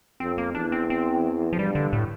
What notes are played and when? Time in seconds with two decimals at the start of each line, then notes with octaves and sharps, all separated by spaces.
0.20 F2 C4
0.38 A#3
0.55 E2 D4
0.72 C4
0.90 C4
1.53 F3
1.59 G2 G3
1.75 D3
1.93 A2